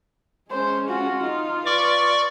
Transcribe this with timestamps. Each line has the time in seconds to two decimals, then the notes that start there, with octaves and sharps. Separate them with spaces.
0.50 G#3 C#4 C5
0.88 F4 F#4
1.22 D#4 F4
1.66 B4 D5 C#6 D6